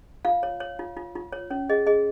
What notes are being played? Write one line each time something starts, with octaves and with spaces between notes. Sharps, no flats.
F4 F5
C#5
C#5
F4
F4
F4
C#5
C#4 C#5
G#4 D#5
G#4 D#5